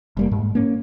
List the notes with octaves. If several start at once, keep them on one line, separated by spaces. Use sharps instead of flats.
F1 G3 A#3
G#2
A#3 C#4